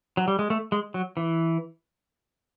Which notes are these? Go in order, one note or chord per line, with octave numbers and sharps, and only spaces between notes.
F#3
G3
G#3
A3
G#3
F#3
E3